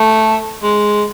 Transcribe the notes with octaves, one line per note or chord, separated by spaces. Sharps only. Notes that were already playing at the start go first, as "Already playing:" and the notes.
Already playing: A3
G#3